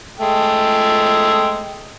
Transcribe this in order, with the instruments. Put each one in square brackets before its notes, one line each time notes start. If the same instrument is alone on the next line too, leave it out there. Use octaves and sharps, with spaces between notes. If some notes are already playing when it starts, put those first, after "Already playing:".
[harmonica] G#3 A3 G5